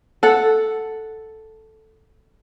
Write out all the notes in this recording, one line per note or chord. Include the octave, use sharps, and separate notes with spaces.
A4 F#5